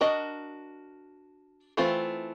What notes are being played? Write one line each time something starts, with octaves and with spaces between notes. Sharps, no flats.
D4 F#4 A#4 D#5
E3 A3 C4 F4